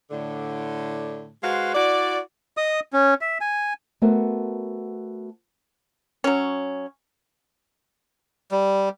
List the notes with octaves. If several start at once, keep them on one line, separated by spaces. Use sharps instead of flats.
A2 D3
G#3 F#4 B4 C5 F5
E4 F#4 D5
D#5 D#6
C#4
E5
G#5
A3 B3 F#4 A#4 C5 F#5
F#3 C#4
G3